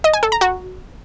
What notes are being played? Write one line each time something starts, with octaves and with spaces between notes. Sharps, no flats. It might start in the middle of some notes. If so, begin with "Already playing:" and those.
D#5
G#5
A4
A#5
F#4